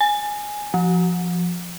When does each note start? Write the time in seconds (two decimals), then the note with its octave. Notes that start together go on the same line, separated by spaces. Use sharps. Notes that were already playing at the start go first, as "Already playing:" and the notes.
0.01 G#5
0.74 F3